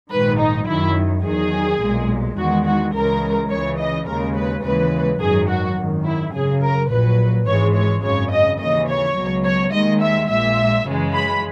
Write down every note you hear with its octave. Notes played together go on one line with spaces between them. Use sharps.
A#1 G#2 D#3 B4
D#4
F#2 D#3 F#3 E4
E2 D#3 F#3 G#4
B1 A#2 G#3
E2 D#3 G#3 F#4
F#4
C#2 C#3 E3 G#3 A#4
C#2 C#3 E3 C#5
D#5
D#2 C#3 G#3 A#4
B4
D#2 C#3 E3 G#3 B4
G#1 F#2 D#3 F#3 G#4
F#4
G#1 F#2 D#3
E4
F#2 C#3 F#3 G#4
A#4
A#1 A#2 F#3 B4
G#1 G#2 E3 G#3 C#5
C#5
G#1 F#2 C#3 C#5
D#5
D#2 C#3 E3 D#5
C#5
C#2 B2 F#3
C#5
D#2 D#3 G#3 D#5
E5
A#1 A#2 G#3 E5
F#2 C#3 E3 G#3
B5